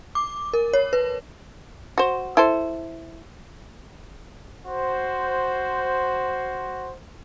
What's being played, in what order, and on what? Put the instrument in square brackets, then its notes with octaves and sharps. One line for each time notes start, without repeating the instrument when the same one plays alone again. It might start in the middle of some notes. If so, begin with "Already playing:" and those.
[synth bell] D6
A#4
C#5
B4
[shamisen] F#4 C5
E4 A4 C5
[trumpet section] F#4 C5